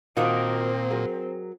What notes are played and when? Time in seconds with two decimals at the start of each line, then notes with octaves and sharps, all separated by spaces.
0.17 A#2 D#3 A#3 C4 D4 F4 F#4 D#5
0.90 F#3 G#4 A#4